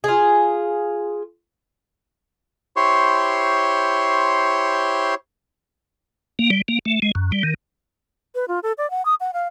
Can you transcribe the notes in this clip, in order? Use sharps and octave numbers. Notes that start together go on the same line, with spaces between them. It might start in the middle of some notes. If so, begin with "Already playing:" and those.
F4 G#4
E4 G4 C5 C#5 C6 C#6
A#3
G3
A#3
A3
G#3
F#2
G3
D#3
B4
F4
A4
D5
F#5
D#6
F#5
F5